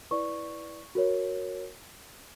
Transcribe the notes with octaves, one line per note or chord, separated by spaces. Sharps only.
E4 B4 D5 C#6
F#4 A#4 C#5